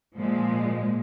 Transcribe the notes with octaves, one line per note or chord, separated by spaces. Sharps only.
A#2 F3 G#3